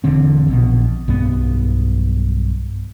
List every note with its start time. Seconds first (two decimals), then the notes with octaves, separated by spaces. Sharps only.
0.04 E1 E2 D3 C4
0.48 A#1 B2
1.08 B1 G2 B3